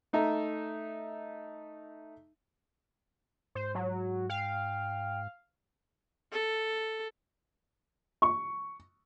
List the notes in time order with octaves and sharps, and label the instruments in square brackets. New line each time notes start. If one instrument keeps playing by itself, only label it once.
[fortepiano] A3 D#4 E5 A#5
[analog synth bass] G#2 [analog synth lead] C5
[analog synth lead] F#3
[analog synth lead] F5 [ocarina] G5
[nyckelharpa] A4
[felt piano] C#6